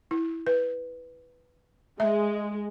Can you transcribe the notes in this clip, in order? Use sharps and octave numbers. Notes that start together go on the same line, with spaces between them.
E4
B4
G#3 E5